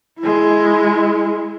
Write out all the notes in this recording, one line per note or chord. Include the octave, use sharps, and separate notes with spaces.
G#3 E4